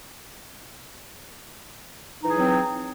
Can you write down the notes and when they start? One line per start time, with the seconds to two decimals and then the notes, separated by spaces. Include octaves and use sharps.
2.21 D#4
2.25 E3
2.30 G#4
2.34 F#3
2.39 C4